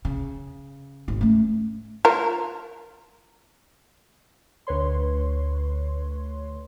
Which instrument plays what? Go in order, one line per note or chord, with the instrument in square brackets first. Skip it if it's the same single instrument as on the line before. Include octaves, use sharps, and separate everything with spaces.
[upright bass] C#3
G#1 G#3
A3 C#4
[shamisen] F4 A#4
[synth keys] D2 B4 C#5 C6